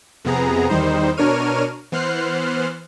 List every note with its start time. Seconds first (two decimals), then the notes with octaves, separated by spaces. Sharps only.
0.25 F2 C3 B3 G#4 A#5
0.69 E2 D#3 G3 D#4 C5
1.17 B2 D4 A#4 C#5 F6 D#7
1.92 E3 B3 C5 F6 F#6 C7